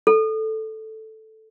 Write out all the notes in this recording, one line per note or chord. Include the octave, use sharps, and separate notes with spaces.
A4